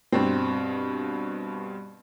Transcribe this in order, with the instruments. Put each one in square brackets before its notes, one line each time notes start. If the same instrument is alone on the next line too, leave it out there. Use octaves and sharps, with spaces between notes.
[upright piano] G2 B2 C4